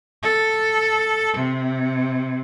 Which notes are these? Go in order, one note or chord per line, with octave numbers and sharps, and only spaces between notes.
A4
C3